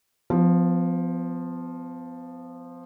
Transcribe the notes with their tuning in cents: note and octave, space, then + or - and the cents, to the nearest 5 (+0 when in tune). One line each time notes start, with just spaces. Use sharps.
F3 +0 B3 +40